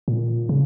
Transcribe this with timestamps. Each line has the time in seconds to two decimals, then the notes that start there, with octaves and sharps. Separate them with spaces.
0.08 A#2
0.49 C#3